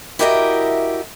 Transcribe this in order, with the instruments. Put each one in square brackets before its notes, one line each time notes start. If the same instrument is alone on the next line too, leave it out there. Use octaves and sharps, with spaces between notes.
[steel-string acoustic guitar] E4 F#4 G4 A#4 D#5 E5